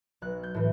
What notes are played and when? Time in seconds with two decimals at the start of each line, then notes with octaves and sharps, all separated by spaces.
0.22 B1 F#6
0.43 G6
0.55 A2 E3